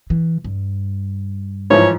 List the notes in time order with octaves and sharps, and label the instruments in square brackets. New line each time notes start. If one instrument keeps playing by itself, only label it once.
[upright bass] E3
G2
[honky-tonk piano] G#2 E3 F3 [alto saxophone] C#5